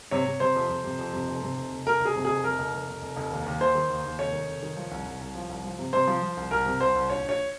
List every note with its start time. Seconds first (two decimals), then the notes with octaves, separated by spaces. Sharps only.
0.11 C3 C#5
0.26 C3
0.40 C3 C5
0.55 F2
0.70 F2
0.84 C3
0.99 F2
1.13 C3
1.27 F1
1.42 C3
1.57 F1
1.71 F1
1.86 F1 A#4
2.01 F1 G#4
2.16 C3
2.25 F1 G#4
2.44 F1 A#4
2.59 F1
2.74 F1
2.88 F1
3.02 F1
3.16 F1
3.31 D#2
3.46 D#2
3.61 D#3 C5
3.75 D#3
3.90 D#2
4.04 D#2
4.19 F1 C#5
4.33 D#3
4.48 F1
4.63 D#3
4.77 F3
4.91 C2
5.06 C2
5.21 C2
5.35 F3
5.49 C2
5.64 F3
5.79 C3
5.93 C3 C5
6.07 F3
6.22 F3
6.37 C2
6.51 C2 A#4
6.66 C3
6.80 C2 C5
6.95 C2
7.09 A#1 C#5
7.24 A#1 C#5